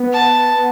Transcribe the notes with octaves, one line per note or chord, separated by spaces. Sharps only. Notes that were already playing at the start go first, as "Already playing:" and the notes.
Already playing: B3
A5